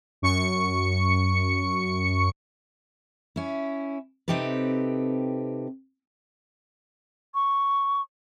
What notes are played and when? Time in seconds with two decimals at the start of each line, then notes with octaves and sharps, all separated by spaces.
0.22 F#2 C#6 C#7
3.36 C#4 E4
4.28 C3 C4 D#4 G4 A4 B4
7.35 C#6